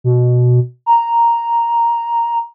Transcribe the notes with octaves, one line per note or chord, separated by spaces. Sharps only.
B2
A#5